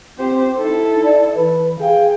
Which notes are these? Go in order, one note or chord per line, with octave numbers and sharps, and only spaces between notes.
C4 G4 C5
D#4 E4 A4
D5
E3 B4
G#4 F5 G5